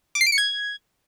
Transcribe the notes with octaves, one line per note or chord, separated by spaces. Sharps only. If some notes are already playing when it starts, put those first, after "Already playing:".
D6
C7
D7
C#7
G#6